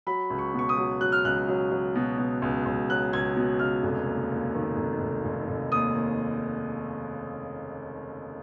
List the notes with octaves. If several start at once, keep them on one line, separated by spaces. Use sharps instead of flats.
F#3 B5
C#2
C#6
B2 C#6
D#6
F#3
F#3 F#6
F6
C#2 F#6
F#3
F#3
B2
B2
C#2
C#2
F#3 F#6
C#2 G#6
B2
C#2 F6
F1
D#2
D#2
D#3
F1
F1
F1
F1
D#2 D#6
D#2